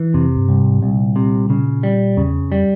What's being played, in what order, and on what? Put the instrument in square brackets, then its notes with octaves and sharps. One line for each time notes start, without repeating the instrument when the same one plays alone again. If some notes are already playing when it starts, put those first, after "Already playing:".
Already playing: [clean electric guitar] E3
[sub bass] F2 [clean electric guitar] C3
[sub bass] G2
[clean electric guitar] C2
[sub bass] G#2
[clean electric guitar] C2 [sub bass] A#2
[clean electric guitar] C3
C#3
G3
[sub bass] E2 [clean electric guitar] C#3
[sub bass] F2
[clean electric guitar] G3